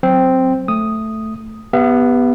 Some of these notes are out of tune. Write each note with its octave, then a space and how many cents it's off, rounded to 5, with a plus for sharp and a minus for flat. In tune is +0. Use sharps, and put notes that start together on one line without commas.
F#3 +0 C4 +0
A3 +0 D#6 +0
B3 +0 G4 +15 E5 +45